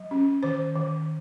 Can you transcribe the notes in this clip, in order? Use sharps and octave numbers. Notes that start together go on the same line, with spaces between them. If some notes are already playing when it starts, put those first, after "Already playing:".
Already playing: F#3
C#4
D#3 C5
D#3